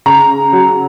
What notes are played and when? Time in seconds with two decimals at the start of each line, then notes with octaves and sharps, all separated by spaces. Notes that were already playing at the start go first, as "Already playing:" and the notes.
0.06 C#3 A#5
0.53 F#3